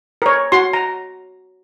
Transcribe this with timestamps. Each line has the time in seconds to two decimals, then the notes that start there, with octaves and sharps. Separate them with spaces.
0.22 A#4 C#5
0.52 F#4 C6
0.73 A#5